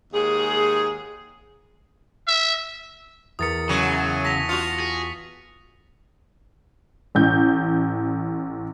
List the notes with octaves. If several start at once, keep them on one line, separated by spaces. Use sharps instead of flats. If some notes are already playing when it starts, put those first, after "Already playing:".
D#2 G#2 G#4
E5
E2 A#4 D#6 A6 B6 C#7
F#2 C#3 F#3 C#6 D#7
A5 A#6 B6 F7
F4 F#4 C#7 F7
G#4
A1 G6